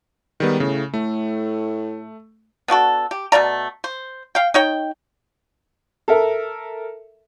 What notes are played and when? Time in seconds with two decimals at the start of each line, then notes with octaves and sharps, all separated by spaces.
0.40 G#2 D#3 G3 B3
0.60 A2 C#3
0.94 A2 A3
2.68 B3 D4 F#4 A4
3.11 G4
3.32 B2 A3 D5 A#5
3.84 C5
4.35 F5 G5
4.54 D#4 C#5 G5
6.08 A4 A#4 E5